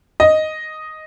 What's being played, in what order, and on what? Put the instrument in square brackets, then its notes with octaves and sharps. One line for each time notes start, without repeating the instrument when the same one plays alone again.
[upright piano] D#5